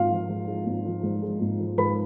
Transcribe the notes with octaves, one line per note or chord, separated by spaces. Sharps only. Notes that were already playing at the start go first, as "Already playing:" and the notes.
Already playing: G#1 G#2 G#3 F4 F5
F3
G#2
G#3
G#1
F3
G#2
G#3
G#1
F3
G#2 B4 B5